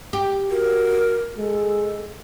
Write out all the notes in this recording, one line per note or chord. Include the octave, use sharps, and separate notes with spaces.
G4
F#4 A#4
G#3 A4